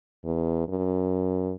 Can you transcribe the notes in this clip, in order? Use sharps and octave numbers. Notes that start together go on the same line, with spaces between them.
E2
F#2